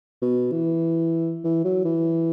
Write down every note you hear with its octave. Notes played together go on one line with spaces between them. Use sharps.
B2
E3
E3
F#3
E3